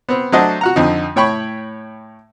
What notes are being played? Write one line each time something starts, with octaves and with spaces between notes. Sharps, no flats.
B3 C4
F#3 A3 D4 C5 D#5 F#5
F#4 F#5 A#5
F2 D3 D#4
A2 C#5 G5 B5 C#6